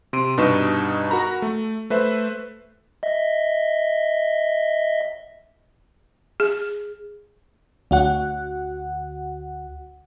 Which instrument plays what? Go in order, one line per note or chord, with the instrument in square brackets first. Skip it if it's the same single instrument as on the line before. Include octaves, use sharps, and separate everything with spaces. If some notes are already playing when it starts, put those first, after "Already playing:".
[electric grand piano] C3 C6 D7 D#7
G2 B2 D#4 B4 C#6 E7
F#4 A#4 A#5 B5
A3
A3 B4 C5 E5
[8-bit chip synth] D#5 E5
[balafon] G#4
[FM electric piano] D2 F#4 F#5